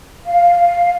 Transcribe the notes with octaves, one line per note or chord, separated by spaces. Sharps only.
F5